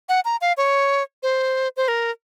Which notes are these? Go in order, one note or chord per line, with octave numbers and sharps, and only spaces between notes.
F#5
A#5
F5
C#5
C5
C5
A#4